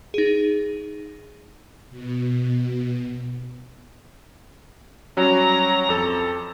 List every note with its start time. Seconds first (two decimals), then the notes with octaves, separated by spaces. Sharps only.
0.14 D#4 G#4
1.90 B2
5.17 F#3 G3 C#4 A#5
5.89 F2 A4